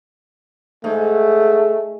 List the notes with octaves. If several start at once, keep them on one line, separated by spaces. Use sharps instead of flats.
G#2 A3